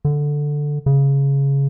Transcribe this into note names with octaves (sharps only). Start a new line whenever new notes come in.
D3
C#3